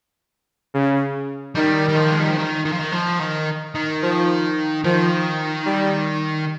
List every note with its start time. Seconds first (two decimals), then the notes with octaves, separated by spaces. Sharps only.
0.74 C#3
1.55 D#3 G3
1.89 G3
1.96 F3
2.11 G#3
2.20 G3
2.28 F3
2.38 D#3
2.65 D#3
2.72 F3
2.79 D#3
2.92 F3
3.19 D#3
3.75 D#3
4.02 F3
4.84 D#3 F3
5.66 G3